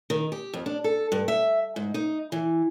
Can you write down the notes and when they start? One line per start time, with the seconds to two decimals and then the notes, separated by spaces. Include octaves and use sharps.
0.10 D#3
0.32 G4
0.54 F2
0.66 D4
0.84 A4
1.12 G2
1.28 E5
1.76 G#2
1.94 D#4
2.32 E3